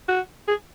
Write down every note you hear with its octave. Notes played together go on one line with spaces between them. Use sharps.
F#4
G#4